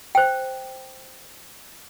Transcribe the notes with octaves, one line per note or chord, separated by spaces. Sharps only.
C5 G5